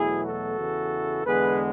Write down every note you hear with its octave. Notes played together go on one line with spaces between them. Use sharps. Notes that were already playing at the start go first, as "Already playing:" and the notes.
Already playing: E2 B2 F#3 A3 E4 G#4
F#4 A4
E2 C#3 E3
E2 D3 G#3 B3 G#4 B4